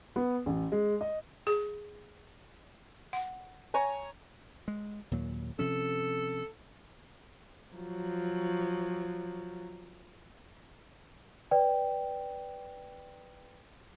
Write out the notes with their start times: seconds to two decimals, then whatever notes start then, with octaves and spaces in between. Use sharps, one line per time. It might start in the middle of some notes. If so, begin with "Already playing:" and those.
0.16 B3
0.46 A1
0.72 G#3
1.01 D#5
1.47 G#4
3.13 F#5
3.74 C#5 G#5 A#5
4.68 G#3
5.11 D#2 A#2 F#3
5.59 C3 F3 C#4 A4
7.76 F3 F#3
11.51 B4 D5 G5